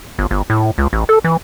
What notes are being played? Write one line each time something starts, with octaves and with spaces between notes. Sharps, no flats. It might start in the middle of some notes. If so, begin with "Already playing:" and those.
G1
G1
A2
C#2
A1
A4
E3